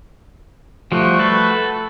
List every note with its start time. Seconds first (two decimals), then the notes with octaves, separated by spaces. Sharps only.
0.92 F3 G3 A3 F#4
1.19 A4 B4